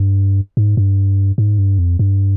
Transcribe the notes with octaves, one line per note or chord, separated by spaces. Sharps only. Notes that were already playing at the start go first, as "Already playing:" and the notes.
Already playing: G2
G#2
G2
G#2
G2
F2
G2